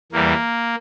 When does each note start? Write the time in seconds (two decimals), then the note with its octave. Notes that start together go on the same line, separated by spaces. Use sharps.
0.12 E2 E3 G3 A#3